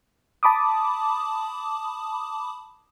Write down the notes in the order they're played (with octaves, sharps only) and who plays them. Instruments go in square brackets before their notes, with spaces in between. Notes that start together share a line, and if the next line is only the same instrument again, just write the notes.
[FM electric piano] A5 B5 D6 D#6